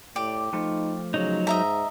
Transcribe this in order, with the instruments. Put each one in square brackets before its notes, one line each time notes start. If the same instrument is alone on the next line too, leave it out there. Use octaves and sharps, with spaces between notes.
[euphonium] A2 [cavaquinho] G4 [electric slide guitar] D5
[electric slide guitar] F3 A3 F4 [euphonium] D#4
[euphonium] C#3 [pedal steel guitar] F#3 D#4
[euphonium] G#2 [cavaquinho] D#5 E5 A#5